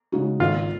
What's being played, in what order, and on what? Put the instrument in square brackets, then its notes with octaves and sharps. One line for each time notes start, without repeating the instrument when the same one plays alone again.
[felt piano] C#3 G#3 D#4 F#4
[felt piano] G#1 [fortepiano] F4